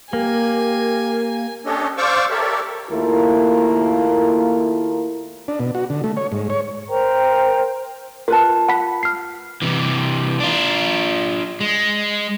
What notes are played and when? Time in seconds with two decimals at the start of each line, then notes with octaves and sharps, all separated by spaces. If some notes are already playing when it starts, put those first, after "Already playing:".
0.13 A#3 G4 A#4 G#5
1.65 C#4 D4 G4 A4 C#5 D#5
1.97 C5 D5 F5 C#6 D6 E6
2.30 G4 A4 A#4 C#5 D5 E5
2.90 D#2 A3 A#3 E4 F4 A#4
5.48 D4
5.60 B2
5.75 F#4
5.90 D3
6.04 A3
6.17 C#5
6.32 G#2
6.50 C#5
6.89 A#4 C5 G5 A#5
8.28 F4 A#4 B4 A5
8.68 F#5 B5 B6
9.03 F6 C7
9.62 C3 E3
10.40 D4 F4
11.61 G#3